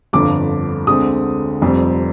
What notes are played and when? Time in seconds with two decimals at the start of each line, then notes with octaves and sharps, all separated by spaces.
0.13 G1 F2 D3 F3 D6
0.87 D2 D3 G#3 C4 D#6
1.62 F1 F2 C3 G3 C4